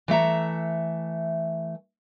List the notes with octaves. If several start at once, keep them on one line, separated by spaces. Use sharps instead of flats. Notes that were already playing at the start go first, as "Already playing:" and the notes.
E3 A3 E5 A#5